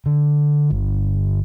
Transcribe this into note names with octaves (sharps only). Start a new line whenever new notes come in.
D3
G1